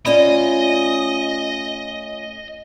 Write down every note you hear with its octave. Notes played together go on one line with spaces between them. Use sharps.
A3 C#4 F4 D5 D#5 B5